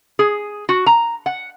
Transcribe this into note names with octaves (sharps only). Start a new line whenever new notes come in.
G#4
F#4
A#5
F#5